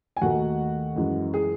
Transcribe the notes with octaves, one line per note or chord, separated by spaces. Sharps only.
G#5
D#2 D#3 A3 D#4 F#4 F#5
F#2 E3 G#3
G#4